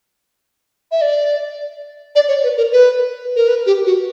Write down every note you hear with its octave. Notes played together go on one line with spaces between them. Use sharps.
E5
D5
D5
C#5
B4
A#4
B4
A#4
B4
G4
F#4